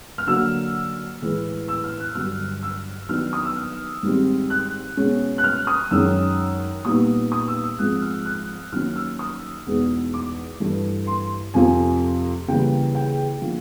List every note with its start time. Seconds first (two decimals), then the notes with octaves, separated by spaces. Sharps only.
0.18 F6
0.27 D3 F#3 A#3 E6
1.22 A2 E3 G#3
1.68 E6
1.84 F6
2.00 F#6
2.15 G2 D3 F#3 F6
2.63 E6
3.09 D#3 F#3 B3 D4 F6
3.33 D#6
3.45 E6
3.56 F6
4.03 G#2 D#3 G3 C4
4.50 F#6
4.97 B2 G#3 C#4
5.38 F#6
5.44 F6
5.67 D#6
5.91 F#2 D#3 G#3 C#4 E6
6.85 A#2 G3 B3 D#4 D#6
7.32 D#6
7.48 E6
7.63 E6
7.79 G#2 F3 G#3 C4 F#6
8.02 F6
8.25 F#6
8.72 D#3 F#3 A#3 C#4 F6
8.96 E6
9.19 D#6
9.66 E2 B2 G#3 B3 D#4
10.14 D6
10.60 G2 E3 A3
11.07 C6
11.54 F2 C3 F3 A3 C4 G#5
12.48 C#3 E3 G3 A#3 G5
12.95 G5
13.42 D3 F3 A#3